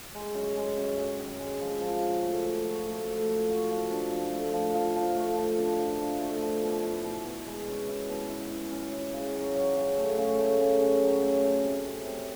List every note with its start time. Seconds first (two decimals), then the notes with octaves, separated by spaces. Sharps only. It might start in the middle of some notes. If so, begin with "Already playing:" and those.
0.15 G#3
0.34 F#2
0.56 G#3
0.77 F#2
0.97 F#2
1.19 D#3
1.39 G#3
1.61 F3
1.81 F3
2.02 F#4
2.23 A3
2.44 F3
2.66 F#4
2.86 A3
3.07 A3
3.28 F3
3.49 F#4
3.70 F3
3.91 D4
4.11 F3
4.32 A3
4.53 F3
4.74 F3
4.96 F3
5.16 A3
5.37 F3
5.58 D4
5.79 F3
6.00 D4
6.21 A3
6.42 F3
6.63 B2
6.83 E4
7.04 B2
7.25 B2
7.46 G#3
7.68 C#4
7.88 E4
8.09 B2
8.30 E4
8.51 E4
8.71 C#4
8.93 E4
9.13 C#3
9.35 F#3
9.55 F#3
9.76 C#3
9.97 A3
10.18 C#3
10.39 A3
10.61 C#3
10.81 C#3
11.02 F#3
11.23 A3
11.44 A3
11.64 C3
11.86 C3
12.06 C3